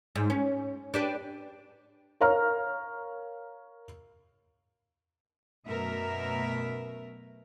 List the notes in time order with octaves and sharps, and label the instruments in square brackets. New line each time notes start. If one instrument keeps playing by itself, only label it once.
[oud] G#2
C#4
D4 G4 B4
[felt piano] A#4 C#5 F5 A#5 F6
[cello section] F#2 B2 A3 A#4 E5